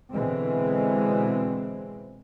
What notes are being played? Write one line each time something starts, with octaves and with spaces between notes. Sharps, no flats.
B2 D3 E3 G#3 C4